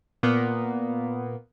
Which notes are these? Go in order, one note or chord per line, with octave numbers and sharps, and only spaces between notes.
A#2 A#3 B3